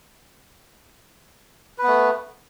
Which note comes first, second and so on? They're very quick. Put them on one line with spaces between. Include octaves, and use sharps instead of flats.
B4 B3 A3